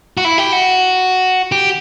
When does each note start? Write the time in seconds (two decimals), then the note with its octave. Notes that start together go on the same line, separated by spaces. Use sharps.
0.17 F#4
0.25 E4
0.38 G4
0.52 F#4
1.52 G4